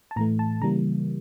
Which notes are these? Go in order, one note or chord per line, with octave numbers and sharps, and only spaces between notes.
A5
A2 E3 A3 A#5
A5
C#3 E3 G3 A#3 A#5